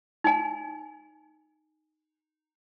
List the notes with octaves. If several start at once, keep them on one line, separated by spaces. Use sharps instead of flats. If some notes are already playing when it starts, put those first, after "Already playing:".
D#4 G#5